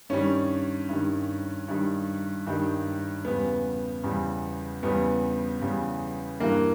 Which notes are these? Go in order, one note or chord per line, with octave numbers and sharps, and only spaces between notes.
G2 D#3 G3 C#4
G2 D#3 G3
G2 D#3 G3
G2 D#3 G3
E2 C#3 G3 B3
E2 C#3 G3
E2 C#3 G3 B3
E2 C#3 G3
G2 E3 G3 A#3